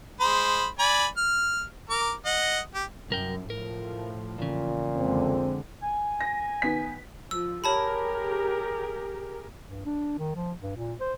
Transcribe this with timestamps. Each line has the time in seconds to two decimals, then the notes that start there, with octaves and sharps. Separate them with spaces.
0.21 G#3 C5 B5
0.79 D5 G#5 B5
1.17 F6
1.90 A#4 D6
2.26 D#5 F#5
2.75 G4
3.10 C2 F#2 A#4 G5
3.50 A2 F3 A#4
4.38 E2 A#2 C#3
4.97 F2 D3 G#3 C4
5.82 G#5
6.21 A#6
6.62 D#3 B3 B6
7.31 F3 E6
7.64 G4 G#4 A#4 C#5 A5 B5
9.68 G2
9.86 D4
10.18 D#3
10.36 F3
10.61 G2
10.77 A#2
11.00 C5